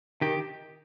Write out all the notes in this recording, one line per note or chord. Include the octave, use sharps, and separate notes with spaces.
D#3 G4